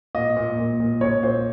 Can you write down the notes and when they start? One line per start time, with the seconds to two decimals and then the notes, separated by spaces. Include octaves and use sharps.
0.15 A#2 D#5
0.37 A#2
0.58 A#2
0.80 A#2
1.01 A#2 C#5
1.23 A#2 C5